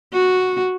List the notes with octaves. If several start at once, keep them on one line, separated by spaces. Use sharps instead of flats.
F#4